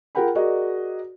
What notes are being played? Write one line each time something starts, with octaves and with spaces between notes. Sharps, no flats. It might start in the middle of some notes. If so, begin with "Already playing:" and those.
F4 G#4 A#4 F#5 G5 B5
F#4 G#4 A#4 D5 D#5